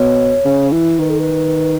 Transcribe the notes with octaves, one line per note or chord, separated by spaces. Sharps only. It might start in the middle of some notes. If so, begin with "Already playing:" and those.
Already playing: B2 C#5
C#3
E3
D#3 B4
A4
B4